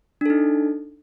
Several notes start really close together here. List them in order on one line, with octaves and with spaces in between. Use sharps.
D4 A4 D#4